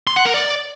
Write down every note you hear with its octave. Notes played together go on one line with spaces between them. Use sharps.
C6
F#5
A#4
D5